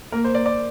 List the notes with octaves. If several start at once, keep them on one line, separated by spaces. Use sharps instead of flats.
A#3 A#4
C5
D5
D5